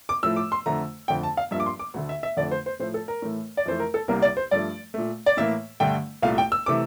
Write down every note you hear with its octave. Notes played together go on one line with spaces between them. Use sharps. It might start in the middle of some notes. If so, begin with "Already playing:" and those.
D6
A2 F3 A3 E6
D6
C6
F2 D3 A3 A#5
F2 D3 A3 G5
A5
F5
G2 F3 A#3 E5
D6
C6
D6
D2 D3 A3
E5
E5
F2 D3 A3 D5
C5
C5
A2 F3 A3 C5
A4
A#4
A2 E3 A3
D5
F2 E3 A3 C5
A#4
A4
C2 C3 G3 A#3 A#4
D5
C5
G2 F3 A3 D5
A#2 A3
D5
A2 E3 A#3 E5
G2 D3 A3 G5
C2 A#2 A3 F5
G5
E6
C3 E3 A3 D6